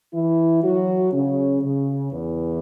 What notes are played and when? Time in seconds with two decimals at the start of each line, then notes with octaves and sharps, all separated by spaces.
0.14 E3 E4
0.64 F#3 F#4
1.13 C#3 C#4
1.63 C#3
2.13 E2 E3